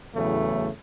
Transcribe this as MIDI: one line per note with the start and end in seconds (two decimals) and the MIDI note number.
0.15 0.68 40
0.15 0.68 45
0.15 0.68 49
0.15 0.68 54
0.15 0.68 57